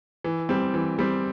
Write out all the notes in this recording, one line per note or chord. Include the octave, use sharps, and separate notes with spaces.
E3
G3 C4
E3
G3 C4